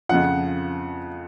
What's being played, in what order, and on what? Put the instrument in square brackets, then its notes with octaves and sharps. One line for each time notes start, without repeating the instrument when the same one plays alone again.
[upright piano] F2 C#3 F3 F#5